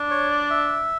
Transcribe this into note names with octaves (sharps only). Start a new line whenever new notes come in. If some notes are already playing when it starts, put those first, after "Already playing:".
Already playing: D4
C#5
D5
E5